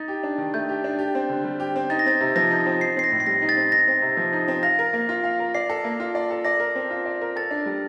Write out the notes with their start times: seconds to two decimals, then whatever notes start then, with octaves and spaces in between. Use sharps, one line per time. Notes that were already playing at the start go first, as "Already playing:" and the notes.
Already playing: D#4 A6
0.08 G4
0.23 D4
0.38 D#3
0.54 A3 G6
0.69 G4
0.84 D4
0.99 G4
1.15 C4
1.30 D3
1.44 G3
1.60 G4
1.76 C4
1.90 D#4 A6
1.99 A#6
2.06 C4 A6
2.20 C3
2.36 F3 A#6
2.50 D#4
2.66 C4
2.81 D#4 C7
2.97 C4 C7
3.04 A#6
3.12 A2
3.20 C7
3.27 G3 A#6
3.42 D#4
3.49 A6
3.57 C4
3.72 D#4 A#6
3.88 C4
4.02 C3
4.17 F3
4.33 D#4
4.48 C4
4.63 F5 A#6
4.79 A#4
4.93 A#3
5.09 F4
5.24 F5
5.39 A#4
5.55 D5 C7
5.70 A4
5.84 A#3
6.00 F4
6.15 D5
6.31 A4
6.45 D5 A#6
6.60 A#4
6.75 C4
6.90 F4
7.06 D5
7.21 A#4
7.36 A4 A6
7.51 D4
7.66 G3